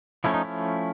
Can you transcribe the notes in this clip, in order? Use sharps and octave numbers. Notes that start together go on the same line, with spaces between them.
F3 A3 C#4 E4
D#4
E4